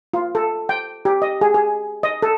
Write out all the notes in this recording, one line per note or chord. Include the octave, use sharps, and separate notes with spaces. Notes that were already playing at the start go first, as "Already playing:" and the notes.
F4
A4
G5
G4
D#5
G#4
G#4
D#5
A4